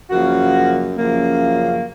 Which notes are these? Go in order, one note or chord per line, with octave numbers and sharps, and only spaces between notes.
F#2 C#3 F3 A#3 F#4
F#2 C#3 F3 A#3